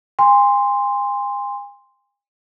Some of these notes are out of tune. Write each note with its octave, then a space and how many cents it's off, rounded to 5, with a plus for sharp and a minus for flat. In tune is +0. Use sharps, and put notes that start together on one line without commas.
G#5 -40 C6 +0